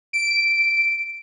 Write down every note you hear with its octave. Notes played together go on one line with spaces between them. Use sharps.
D7